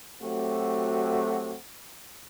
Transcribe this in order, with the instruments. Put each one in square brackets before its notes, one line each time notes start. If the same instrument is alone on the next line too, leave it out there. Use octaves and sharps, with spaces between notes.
[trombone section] F#3 A3 C4 F#4 G4